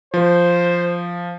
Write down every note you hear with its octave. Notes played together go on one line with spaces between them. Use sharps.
F3 C5